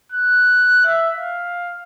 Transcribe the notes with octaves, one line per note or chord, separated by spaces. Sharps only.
F#6
E5
F5